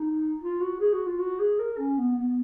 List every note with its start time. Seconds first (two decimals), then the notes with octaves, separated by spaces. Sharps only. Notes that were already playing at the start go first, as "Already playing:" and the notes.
Already playing: D#4
0.42 F4
0.61 F#4
0.80 G#4
0.93 F#4
1.07 F4
1.19 F#4
1.39 G#4
1.59 A#4
1.78 C#4
1.98 B3
2.17 B3